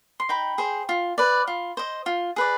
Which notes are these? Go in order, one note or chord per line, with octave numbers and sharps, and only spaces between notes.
C6
D#4 G5 B5
G#4 C5
F4
B4 D5
F4
C5 D#5
F4
G#4 B4 D5